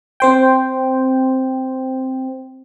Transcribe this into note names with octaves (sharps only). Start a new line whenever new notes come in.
C4 C5 G5